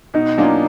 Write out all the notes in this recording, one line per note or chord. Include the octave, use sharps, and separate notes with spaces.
B2 D#4
F#3 A#3 C#4 D4 F4